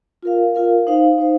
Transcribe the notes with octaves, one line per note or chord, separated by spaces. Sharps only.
F4 A#4 F5
F4 A#4 F5
D#4 C5 F5
D#4 C5 F5